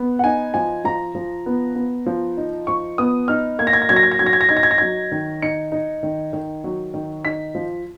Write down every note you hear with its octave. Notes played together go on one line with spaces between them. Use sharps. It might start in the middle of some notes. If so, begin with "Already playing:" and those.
Already playing: B3
F#5
D#4 G#5
F3 G#5
F3 A#5
F3
B3
B3
F3
D#4
F3 C#6
B3 D#6
D#4 F6
A#3 G#6
A#6
G#6
A#6
F#3 G#6
A#6
G#6
A#6
F#3 G#6
A#6
G#6
A#6
D#4 G#6
A#6
G#6
A#6
F#3 G#6
D#3
D#4 C#7
D#4
D#3
D#3
F#3
D#3
D#4 B6
F3